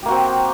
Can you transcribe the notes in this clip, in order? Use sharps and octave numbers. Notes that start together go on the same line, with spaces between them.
A#3 C4 F#4 G4